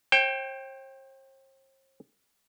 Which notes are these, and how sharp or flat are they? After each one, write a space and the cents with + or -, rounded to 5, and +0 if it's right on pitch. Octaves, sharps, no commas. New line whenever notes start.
C5 +45 G5 +0